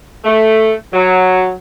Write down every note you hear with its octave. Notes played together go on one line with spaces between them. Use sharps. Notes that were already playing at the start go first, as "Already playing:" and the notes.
A3
F#3